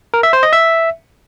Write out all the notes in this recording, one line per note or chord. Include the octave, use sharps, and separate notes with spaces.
A#4
E5
C5
D#5
E5